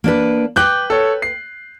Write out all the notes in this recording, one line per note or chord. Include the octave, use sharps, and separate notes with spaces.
A#3 D4 B4
B4 G5 D6 F#6 G6
A4 C#5
C7